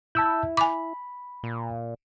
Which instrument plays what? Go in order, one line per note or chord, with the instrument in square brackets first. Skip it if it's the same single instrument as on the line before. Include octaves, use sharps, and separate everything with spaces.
[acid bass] E4 [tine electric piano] A5 E6 G6
[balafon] G#5 D6 [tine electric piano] B5
[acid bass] A#2